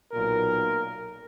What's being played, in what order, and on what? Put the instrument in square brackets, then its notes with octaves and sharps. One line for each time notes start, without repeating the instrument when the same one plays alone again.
[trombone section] B1 A#2 A#4